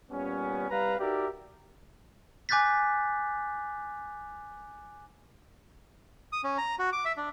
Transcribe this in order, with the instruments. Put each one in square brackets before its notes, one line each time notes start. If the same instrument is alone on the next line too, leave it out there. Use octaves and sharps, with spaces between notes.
[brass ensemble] A#2 G3 B3 C#4
C2 G3 B4 F5 A#5
D#4 F#4 G4 A#4 D5 E5
[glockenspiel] G#5 D6 F#6 G6 A6 B6
[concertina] D#6
C#4
A#5
F#4
D6
E5
D4